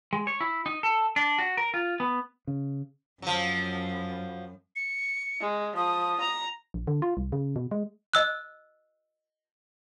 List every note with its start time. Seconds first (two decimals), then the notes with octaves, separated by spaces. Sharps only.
0.13 G#3
0.27 C#5
0.41 E4
0.66 D#4
0.83 A4
1.16 D4
1.38 F#4
1.57 A#4
1.74 F4
2.00 B3
2.47 C#3
3.22 F#2 F3 F#3
4.76 C#7
5.41 G#3
5.76 F3 D#6
6.20 A#5
6.74 A#1
6.87 D3
7.02 F4
7.17 C2
7.32 C#3
7.56 B2
7.71 G#3
8.14 D#5 E6 F#6